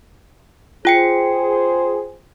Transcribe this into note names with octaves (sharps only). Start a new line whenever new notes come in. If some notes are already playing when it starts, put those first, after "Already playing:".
F4 G#4 C5 G5 C#7